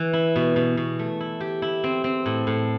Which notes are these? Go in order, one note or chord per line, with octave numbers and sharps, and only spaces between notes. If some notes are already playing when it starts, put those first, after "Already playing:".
Already playing: E3
E4
B2
B2
B2
A3
E4
G4
E4
C4
C4
A2
A2